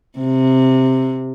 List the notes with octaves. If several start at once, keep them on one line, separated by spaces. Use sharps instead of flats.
C3